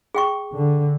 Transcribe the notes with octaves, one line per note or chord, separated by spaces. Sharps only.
G#4 G5 C#6
D3